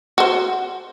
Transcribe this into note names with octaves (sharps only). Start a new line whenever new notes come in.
F#4 C5